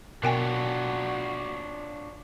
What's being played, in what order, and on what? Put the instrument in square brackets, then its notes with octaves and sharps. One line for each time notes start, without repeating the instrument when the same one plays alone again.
[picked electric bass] B2 [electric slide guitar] D4 F4 C#5 [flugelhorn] F#4 [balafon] A#4 G5 G#5